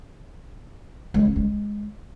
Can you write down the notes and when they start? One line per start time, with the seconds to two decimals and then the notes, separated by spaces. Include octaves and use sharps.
1.14 G#3
1.25 C#4
1.36 G#3